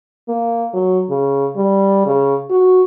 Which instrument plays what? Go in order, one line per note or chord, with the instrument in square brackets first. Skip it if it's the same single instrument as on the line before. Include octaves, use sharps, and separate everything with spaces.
[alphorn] A#3
F#3
C#3
G3
C#3
F#4